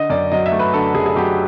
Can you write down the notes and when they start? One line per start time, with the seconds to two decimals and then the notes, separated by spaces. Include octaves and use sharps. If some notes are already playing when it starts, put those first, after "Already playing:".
Already playing: D3 D#5
0.10 F#2 D5
0.32 F#3 D#5
0.46 E5
0.52 A3
0.59 B4
0.73 D3 A4
0.94 F#2 G#4
1.06 G#4
1.16 F#3 G4